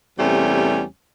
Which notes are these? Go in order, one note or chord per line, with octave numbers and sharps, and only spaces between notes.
E2 C3 G3 A3 C#4